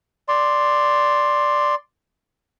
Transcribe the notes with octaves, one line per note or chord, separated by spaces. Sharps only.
D5 C6